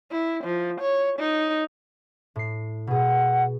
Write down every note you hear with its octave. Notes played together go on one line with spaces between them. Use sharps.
E4
F3
C#5
D#4
A2 C7
B2 G#4 F#5